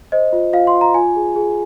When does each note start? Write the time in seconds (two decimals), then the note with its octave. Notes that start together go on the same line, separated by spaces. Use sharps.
0.12 C5 D#5
0.33 F4
0.53 F4 F5
0.67 C6
0.74 F4
0.81 A#5
0.94 F4 G#5
1.16 G#4
1.36 G#4